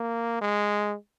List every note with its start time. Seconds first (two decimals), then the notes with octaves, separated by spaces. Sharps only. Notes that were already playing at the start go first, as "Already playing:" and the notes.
Already playing: A#3
0.41 G#3